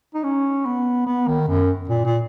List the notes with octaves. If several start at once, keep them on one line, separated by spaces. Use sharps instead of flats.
D#4
C#4
B3
B3
D#3
F#2
A#2
A#2